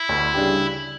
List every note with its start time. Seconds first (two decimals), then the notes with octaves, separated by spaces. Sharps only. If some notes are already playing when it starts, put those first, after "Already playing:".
Already playing: E4
0.09 D2
0.34 C#3 G3 D4 G4